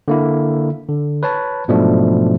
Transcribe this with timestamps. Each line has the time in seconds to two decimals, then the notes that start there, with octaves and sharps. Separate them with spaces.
0.08 D3 A#3 E4
0.89 D3
1.23 B4 C#5 A5
1.68 G#2 B2 F3 F#3 A3 D4